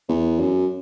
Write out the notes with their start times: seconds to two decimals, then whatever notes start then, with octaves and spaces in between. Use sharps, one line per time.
0.09 E2
0.40 F#2